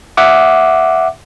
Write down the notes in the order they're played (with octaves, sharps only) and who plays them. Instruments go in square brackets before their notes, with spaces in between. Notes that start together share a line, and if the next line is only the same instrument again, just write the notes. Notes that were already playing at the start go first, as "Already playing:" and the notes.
[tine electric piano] E5 F#5 D6